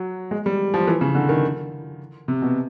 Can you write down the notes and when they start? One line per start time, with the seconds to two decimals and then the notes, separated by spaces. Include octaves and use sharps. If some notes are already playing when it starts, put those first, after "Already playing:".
Already playing: F#3
0.31 G#3
0.46 G3
0.74 F3
0.87 E3
1.01 C#3
1.15 D3
1.29 D#3
2.28 C3
2.42 B2